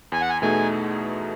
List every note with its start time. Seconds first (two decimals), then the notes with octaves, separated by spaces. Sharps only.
0.12 E2 G#5
0.22 F#5
0.29 G#5
0.42 B2 A3 D#4 G#4 G#5